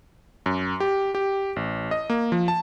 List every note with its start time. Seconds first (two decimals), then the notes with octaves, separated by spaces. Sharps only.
0.46 F#2
0.80 G4
1.15 G4
1.56 A1
1.91 D#5
2.10 A#3
2.32 F3
2.48 A5